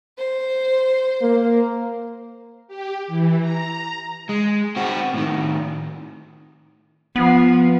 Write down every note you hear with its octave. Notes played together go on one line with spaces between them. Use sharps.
C5
A#3
G4
E3
A#5
G#3
C4 F#4
A2 D#3
F3 B3